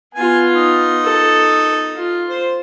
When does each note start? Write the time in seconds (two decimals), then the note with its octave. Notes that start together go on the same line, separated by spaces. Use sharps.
0.15 B3 F4 G#5
0.53 D#4
1.04 A4
1.96 F4
2.29 C5